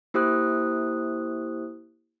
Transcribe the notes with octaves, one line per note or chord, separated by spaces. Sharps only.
A#3 E4 G4 C5 D#6 F#6